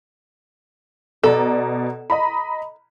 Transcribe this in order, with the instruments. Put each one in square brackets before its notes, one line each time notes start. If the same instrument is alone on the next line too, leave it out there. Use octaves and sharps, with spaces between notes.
[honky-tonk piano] B2 D5 A#5 [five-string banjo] A4
[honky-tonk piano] D#5 A#5 B5